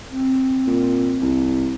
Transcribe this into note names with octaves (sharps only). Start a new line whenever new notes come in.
C4
A#2
C2